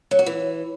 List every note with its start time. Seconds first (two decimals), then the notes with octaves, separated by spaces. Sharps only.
0.11 F#3
0.19 F#4
0.26 E3